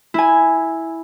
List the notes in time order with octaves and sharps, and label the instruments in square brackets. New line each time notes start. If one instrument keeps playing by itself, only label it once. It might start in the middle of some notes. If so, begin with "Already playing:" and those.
[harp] E4 G#5